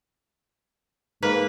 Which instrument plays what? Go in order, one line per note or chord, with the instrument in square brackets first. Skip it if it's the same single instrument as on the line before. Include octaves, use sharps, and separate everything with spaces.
[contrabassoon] G#2 [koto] A#3 [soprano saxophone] B4